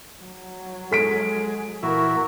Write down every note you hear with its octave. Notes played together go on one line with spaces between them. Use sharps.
F#3
G#3 A4 B6 D7
A#2 E3 E4 F#4 A#4